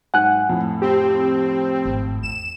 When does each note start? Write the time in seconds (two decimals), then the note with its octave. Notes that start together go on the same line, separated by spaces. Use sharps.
0.14 G#2 F#3 F#4 F#5 G#5 F#6
0.49 F2 A2
0.82 C4 G4
1.85 G#1
2.23 E2 E7